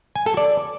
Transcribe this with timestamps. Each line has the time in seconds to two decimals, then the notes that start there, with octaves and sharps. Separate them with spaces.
0.15 G#5
0.26 A4
0.37 D5